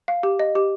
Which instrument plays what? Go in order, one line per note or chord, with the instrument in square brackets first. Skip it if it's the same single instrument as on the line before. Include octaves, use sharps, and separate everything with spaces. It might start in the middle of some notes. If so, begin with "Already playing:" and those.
[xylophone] F5
G4
D#5
G4